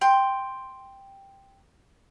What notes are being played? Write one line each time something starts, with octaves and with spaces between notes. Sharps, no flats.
G5 C6